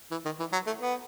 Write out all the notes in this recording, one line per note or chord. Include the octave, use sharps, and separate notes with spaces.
E3
D#3
E3
F#3
A3
B3